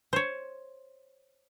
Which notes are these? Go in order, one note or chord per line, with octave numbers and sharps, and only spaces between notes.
C5 C#5